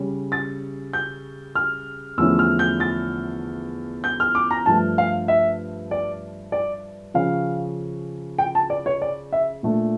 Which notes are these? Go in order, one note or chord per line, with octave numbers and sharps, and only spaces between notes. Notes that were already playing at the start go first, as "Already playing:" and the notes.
Already playing: C#3 G3 C#4
A6
G6
F6
E2 D3 F3 A3 C#4 E6
F6
G6
A6
G6
F6
D6
A#5
G2 F3 A3 D4 A5
F5
E5
D5
D5
C#3 F3 C#4 F5
G5
A5
D5
C#5
D5
E5
A#2 A3 D4